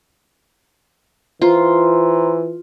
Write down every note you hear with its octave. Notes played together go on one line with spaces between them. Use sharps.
E3 F4 C5 A#5 C6